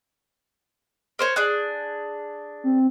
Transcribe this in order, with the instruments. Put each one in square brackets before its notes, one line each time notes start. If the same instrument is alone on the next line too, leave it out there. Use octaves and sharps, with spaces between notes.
[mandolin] A#4 C5 C#5
D4 G#4 F#6
[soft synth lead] C4